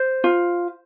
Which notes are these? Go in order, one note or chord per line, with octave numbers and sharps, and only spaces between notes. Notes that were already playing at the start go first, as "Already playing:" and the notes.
Already playing: C5
F4